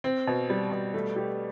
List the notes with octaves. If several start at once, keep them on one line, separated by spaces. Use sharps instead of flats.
C4
B2
G3
B2
A3
G4